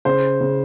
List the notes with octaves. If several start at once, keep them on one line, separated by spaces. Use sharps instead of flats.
C#3 C5
C#3